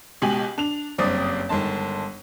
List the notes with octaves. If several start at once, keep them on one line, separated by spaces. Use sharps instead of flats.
C#2 B2 G4 G#5 F#7
D4 F7
F#1 G2 C4 D5 D#6
G1 D#3 G#3 A5